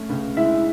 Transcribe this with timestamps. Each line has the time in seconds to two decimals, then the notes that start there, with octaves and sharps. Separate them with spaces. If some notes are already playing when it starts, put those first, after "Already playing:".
Already playing: A3 C#4
0.09 C#2
0.37 G#3 E4 E5